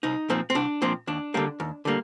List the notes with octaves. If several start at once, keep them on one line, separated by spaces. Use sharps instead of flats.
C2 D#4
A#2 F3 C4
C4
C2 D4
A#2 F3 C4
D#2 D4
D3 G3 A#3
D#2
D3 G3 A#3